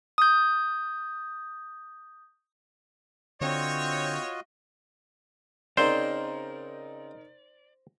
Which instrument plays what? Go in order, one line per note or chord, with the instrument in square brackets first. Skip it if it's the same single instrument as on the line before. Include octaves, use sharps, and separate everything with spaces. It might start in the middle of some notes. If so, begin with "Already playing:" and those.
[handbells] D#6 G6
[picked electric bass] D3 [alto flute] C4 [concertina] F4 F#4 D#5 [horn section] C#5
[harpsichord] C#3 C4 [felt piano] D#4 A#4 [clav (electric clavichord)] C5 [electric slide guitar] D5